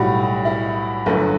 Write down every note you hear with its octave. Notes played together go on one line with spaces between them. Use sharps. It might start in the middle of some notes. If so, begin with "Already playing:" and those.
Already playing: B1 A2 G3 F#4
E4
G1 F#2 D3 A3